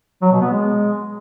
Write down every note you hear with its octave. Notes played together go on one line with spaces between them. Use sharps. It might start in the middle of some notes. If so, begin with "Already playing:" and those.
F#3
B2
B3
G#3